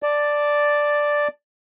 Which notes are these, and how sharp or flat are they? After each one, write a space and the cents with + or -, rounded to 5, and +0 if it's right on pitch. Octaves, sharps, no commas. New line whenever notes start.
D5 +0 A5 +0